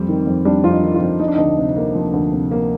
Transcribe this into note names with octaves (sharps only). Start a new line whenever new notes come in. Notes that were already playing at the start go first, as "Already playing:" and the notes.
Already playing: F2 G3 C4
D#3
F2
G3 D4
F2 F4
D#4
D#3
F4
F2
F3 D#4
D4
D2 D#4
C3
A#3
F3
D2
C3
A#3